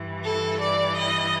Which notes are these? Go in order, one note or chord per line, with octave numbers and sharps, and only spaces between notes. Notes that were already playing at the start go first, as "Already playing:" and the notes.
Already playing: G2 E3
A4
D5
D#5